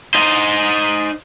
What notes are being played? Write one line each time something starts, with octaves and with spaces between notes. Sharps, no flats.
D#4 C5